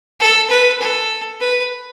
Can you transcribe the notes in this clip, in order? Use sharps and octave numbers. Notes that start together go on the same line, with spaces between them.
A4
B4
A4
B4